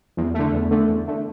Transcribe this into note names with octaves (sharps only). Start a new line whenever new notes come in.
E2
D3 A3
E2
D3 A3
E2
D3 A3